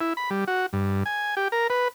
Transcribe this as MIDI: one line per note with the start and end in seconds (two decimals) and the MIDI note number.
0.01 0.13 64
0.17 0.30 83
0.30 0.44 55
0.47 0.66 66
0.73 1.03 43
1.06 1.35 80
1.37 1.48 67
1.52 1.67 70
1.70 1.88 71